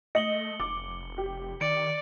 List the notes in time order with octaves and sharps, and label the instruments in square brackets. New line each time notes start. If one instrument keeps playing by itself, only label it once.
[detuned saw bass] A3 [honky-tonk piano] D#5 [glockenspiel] C#7 F#7 G7
[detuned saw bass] F1 [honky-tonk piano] D6
[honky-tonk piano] G4
[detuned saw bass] D#3 [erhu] D5 [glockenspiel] C#7 D7